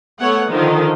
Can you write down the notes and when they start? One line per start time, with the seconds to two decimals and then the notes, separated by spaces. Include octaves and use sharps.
0.19 A3 B3 C#5 F#5
0.48 D3 D#3 F3 D#4